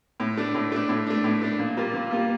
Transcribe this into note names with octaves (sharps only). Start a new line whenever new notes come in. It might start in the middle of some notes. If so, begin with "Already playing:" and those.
A2
A3 D4
A2
A3 D4
A2
A3 D4
A2
A3 D4
A#2
G3 A#3 F4
A#2
G3 A#3 F4